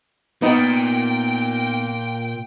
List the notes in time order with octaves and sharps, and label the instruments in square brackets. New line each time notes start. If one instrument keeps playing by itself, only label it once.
[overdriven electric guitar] A#2 [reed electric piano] B3 D#4 [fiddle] G5